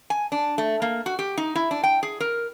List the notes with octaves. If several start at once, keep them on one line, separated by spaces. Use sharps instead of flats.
G#5
D4
A3
A#3
F#4
G4
D#4
E4
D4
G5
G#4
A#4